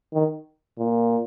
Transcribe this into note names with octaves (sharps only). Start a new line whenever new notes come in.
D#3
A#2